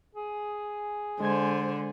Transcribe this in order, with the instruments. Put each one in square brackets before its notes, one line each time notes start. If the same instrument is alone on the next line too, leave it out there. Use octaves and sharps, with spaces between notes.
[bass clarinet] G#4
[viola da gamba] D3 [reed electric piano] G#3 G#5 G#6 [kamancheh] C5